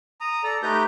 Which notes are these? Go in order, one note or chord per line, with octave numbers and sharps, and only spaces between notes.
A#5 D#6
A4 D5 A#5
A3 D#4 G4 B4 A#5 G6